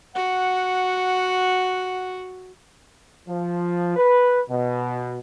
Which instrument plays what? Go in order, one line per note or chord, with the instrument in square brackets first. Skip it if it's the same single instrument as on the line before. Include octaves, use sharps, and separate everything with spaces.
[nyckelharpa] F#4 [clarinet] F#5
[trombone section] F3
B4
B2